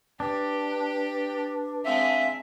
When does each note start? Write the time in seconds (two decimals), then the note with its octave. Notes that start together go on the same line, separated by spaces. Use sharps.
0.20 D4 G4 B4
1.85 G#3 C4 E5 F5